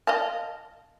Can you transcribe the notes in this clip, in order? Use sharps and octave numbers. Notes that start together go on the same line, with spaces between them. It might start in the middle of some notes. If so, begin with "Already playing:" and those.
D#5 F5 A5